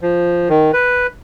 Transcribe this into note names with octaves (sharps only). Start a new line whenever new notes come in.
F3
D#3
B4